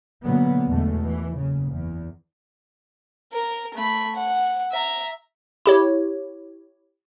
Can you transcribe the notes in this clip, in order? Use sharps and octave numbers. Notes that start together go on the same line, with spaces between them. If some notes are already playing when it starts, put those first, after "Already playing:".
B2 D3 F#3 A#3 B3
E2 B2 D3 G#3 A3
E3
F#1 C#3
E2
A#4
A3 B5
F#5
E5 A#5
E4 G4 C#5